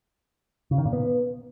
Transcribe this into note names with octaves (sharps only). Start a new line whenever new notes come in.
C#3
D#3
A#2
B3